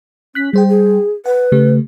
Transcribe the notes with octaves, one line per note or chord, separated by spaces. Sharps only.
C#4 F#6 B6
G3 G#4 C5 G5
G#4
B4 F#5
C#3 A3 G4